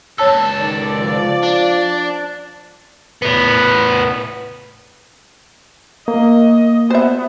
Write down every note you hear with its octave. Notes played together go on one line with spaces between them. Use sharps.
C#2 A4 C#5 A5 E6
D#3 D5
F3
D4
A2 B3
A#3 D#5
B3 C5 E5